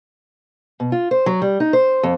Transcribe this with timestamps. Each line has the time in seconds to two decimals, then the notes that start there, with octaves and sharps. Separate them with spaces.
0.80 B2
0.92 F4
1.11 C5
1.26 F#3
1.42 G3
1.60 D#4
1.73 C5
2.03 F2